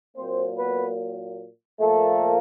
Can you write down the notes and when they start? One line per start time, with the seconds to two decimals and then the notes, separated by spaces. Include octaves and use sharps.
0.17 A#2 F#3 A#3 C4 C5
0.58 B3 B4
1.80 A#2 F3 A3 A#3 A4